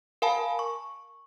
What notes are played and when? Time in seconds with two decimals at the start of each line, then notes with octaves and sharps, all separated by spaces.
0.22 A#4 F5 G#5 A5 B5
0.59 C#6